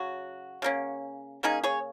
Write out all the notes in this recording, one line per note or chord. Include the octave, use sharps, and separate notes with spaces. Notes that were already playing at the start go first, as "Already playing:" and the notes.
Already playing: C#3 F#3 F#4
C#3 A#3 C#4
C#3 A#3 C#4 D#4 G#4
G#4 C#5